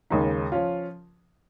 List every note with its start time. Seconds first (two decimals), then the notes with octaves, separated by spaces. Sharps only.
0.10 D#2 C#3 G#3 D#4
0.52 F3 C#4 F4